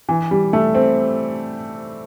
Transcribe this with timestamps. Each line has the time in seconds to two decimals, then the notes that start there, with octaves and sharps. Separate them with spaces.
0.09 E3
0.31 G3
0.53 A3
0.75 C4